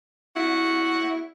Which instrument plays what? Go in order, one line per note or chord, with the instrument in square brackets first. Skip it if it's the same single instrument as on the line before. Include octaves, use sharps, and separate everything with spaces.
[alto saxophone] E4 [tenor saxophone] F#4